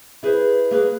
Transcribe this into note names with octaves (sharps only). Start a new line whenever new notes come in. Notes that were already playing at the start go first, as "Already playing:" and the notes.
E4 G#4 B4 C5
A#3 G#4 B4